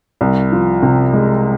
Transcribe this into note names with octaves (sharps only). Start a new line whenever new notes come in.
C2
F3
C3
G#3